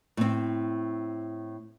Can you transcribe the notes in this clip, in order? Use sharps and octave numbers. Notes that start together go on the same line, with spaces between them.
A2 C4